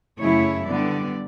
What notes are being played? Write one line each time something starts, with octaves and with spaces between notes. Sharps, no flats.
F#2 C#3 F#3 A3 E4 C#5
D3 G3 B3 D5